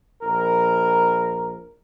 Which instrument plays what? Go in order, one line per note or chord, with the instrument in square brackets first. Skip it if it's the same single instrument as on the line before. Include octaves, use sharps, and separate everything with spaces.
[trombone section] A#1 A#4